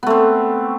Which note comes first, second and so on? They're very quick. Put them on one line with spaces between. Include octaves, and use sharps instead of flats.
B3 A3 C4